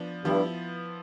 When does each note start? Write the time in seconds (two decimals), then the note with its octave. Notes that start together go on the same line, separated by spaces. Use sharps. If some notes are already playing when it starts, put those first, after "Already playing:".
Already playing: F3 B3 D4
0.24 G2 F3 B3 E4